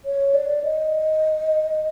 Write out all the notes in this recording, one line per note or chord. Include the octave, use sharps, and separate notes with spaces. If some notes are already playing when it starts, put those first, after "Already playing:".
C#5
D5
D#5